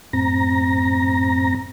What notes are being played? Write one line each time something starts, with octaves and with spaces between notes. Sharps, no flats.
F#2 A2 C4 A#5 A#6